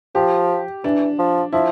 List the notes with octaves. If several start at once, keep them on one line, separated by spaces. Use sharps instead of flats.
F3 G4
E3 D4
F3
F3 E4